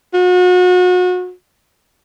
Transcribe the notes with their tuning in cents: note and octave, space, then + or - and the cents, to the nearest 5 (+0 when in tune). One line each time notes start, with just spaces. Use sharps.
F#4 -35